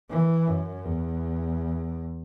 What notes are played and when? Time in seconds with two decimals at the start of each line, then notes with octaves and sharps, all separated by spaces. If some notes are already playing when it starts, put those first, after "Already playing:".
0.10 E3
0.48 F#2
0.85 E2